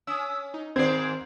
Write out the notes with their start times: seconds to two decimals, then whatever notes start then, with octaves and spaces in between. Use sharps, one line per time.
0.07 C#4 D#6 E6
0.54 D#4
0.76 G#2 D#3 C4 D5 G#6 C7